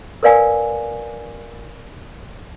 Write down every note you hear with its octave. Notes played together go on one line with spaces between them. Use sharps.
A#4 B4 D5 F5 G#5